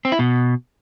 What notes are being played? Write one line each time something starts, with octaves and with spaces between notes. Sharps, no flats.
C4
E4
B2